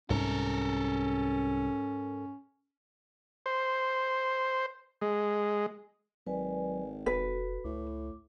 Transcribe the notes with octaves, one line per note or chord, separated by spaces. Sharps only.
C2 G#2 C#4 A4 A#4
C5
G#3
G#1 F#3 B4 D5 G#5
F1 F#4 A4 B4
C#2 A2 D6